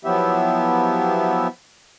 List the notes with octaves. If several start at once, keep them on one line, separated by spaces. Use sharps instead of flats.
F3 F#3 B3 E4 G4 E5